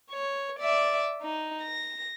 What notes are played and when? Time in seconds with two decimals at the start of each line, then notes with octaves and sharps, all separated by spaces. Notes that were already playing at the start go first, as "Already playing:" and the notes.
0.11 C#5
0.59 D5 E5
1.22 D#4
1.63 A#6